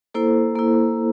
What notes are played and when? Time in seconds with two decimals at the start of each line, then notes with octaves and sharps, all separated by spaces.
0.14 A#3 E4 A4 C5
0.56 A#3 E4